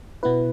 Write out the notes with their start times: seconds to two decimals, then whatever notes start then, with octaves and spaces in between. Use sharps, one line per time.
0.23 B2 B3 E4 B4